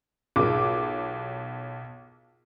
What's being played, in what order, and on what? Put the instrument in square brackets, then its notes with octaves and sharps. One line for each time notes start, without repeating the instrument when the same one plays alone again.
[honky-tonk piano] B1 D6 [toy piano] F4 G#4 A#4